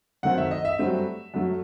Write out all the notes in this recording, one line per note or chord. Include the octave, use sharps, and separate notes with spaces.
F#2 D#3 A3 C4 F#5
E5
D#5
E5
G2 F#3 A3 C4
F#2 F#3 A3